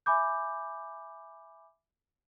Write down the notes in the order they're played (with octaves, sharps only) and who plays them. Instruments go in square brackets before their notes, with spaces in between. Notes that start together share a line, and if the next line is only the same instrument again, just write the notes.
[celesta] E5 G#5 B5 D6 G6